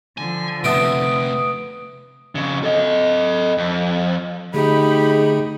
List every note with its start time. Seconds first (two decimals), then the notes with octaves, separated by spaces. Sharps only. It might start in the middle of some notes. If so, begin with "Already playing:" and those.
0.18 D3 F3 G#5
0.64 C3 A3 B3 E4 D#6 D7
2.35 F2 C#3
2.64 A4 D#5
3.58 F2
4.54 D3 A3 D#4 G4 G#4 B5